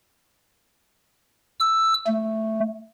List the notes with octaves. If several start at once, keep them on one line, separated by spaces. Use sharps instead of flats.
E6
A3